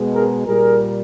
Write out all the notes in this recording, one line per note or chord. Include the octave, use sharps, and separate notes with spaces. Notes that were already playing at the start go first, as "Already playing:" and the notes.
Already playing: B2 G#3
G#4 A#4
A#2 G3 G#4 A#4